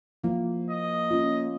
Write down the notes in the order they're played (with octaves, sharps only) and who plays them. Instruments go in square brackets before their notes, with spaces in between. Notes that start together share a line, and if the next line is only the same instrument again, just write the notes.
[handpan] F3 E4 [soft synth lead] A#3
[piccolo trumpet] D#5
[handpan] C#4 F4